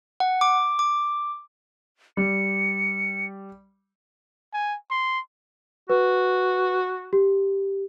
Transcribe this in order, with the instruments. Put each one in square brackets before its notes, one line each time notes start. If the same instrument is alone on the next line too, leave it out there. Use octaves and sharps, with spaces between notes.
[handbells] F#5
D6
D6
[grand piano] G3 [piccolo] C#7
[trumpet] G#5
C6
[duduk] F#4 [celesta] B4
[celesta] G4